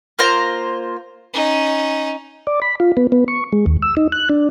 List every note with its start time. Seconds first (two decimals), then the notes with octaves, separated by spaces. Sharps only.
0.19 A#3 F4 C5 A#5
1.33 C#4 D#4
2.47 D5
2.62 B5
2.80 F4
2.97 B3
3.12 B3
3.28 C#6
3.52 G#3
3.66 D#2
3.82 E6
3.97 D#4
4.12 F#6
4.29 D4